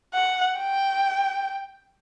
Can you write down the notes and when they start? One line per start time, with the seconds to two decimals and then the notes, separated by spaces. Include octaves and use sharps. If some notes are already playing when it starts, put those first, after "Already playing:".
0.14 F#5
0.58 G5